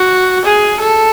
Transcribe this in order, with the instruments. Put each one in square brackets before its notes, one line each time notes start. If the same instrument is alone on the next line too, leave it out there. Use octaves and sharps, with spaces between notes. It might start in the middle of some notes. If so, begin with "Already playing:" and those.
Already playing: [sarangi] F#4
G#4
A4